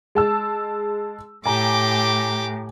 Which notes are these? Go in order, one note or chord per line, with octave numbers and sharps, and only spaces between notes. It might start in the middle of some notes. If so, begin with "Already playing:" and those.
G#3 A5 E6
A2 G4 G#5 A#5 D6